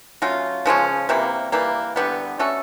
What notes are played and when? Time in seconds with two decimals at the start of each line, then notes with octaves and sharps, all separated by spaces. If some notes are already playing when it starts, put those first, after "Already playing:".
0.22 F#3 A3 C#4 F4
0.66 C#3 F3 G#3 C#4
1.09 C3 E3 G3 A#3
1.52 E3 G3 A#3
1.96 D3 G3 B3
2.39 A3 C#4 F#4 A4